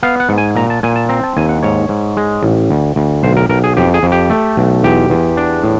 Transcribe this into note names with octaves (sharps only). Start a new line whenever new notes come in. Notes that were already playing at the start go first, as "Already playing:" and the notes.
B3 F5
F#5
G#2
G#5
A#2 A#5
A5
A#2 G#5
A5
C4 A#5
A5
D#2 G#5
F#5
G#2 C#5
G#2
G#3
A1
D2
D2
B1 C5
A#4
B1 A#4
G#4
F2 G4
G#4
F2
G4
A3
B1
E2 G4
E2
D4
A2